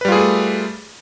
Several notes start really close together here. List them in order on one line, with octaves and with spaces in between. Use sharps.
B4 G3 F4 G#4 A3